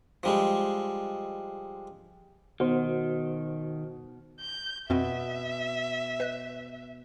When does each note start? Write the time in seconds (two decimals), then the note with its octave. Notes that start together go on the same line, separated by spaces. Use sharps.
0.23 F3 G3 G#3
2.60 B2 D#3 F#4 C5
4.41 G6
4.90 F2 B2 C4 D#5 E5
6.20 B4 D#5 F#6